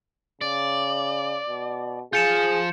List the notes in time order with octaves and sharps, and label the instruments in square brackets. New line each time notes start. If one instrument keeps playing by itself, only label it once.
[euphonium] C#3 [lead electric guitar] D5
[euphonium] B2
[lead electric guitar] F3 F4 [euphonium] G#4 [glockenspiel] G6 C#7 E7